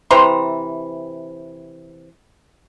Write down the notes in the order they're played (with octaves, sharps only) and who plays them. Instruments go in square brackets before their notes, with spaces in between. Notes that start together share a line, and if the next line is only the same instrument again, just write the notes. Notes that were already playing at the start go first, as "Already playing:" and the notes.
[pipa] C3 E3 C5 A#5